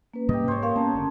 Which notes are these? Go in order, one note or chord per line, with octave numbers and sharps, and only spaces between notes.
A#3 C#4 B4
G#2 C3 G3 G4 D#5
G#2 C5 C#5
A#3 A#4 C5 C#5 F5
A#3 B3 C#4 A5 A#5
F#1 D3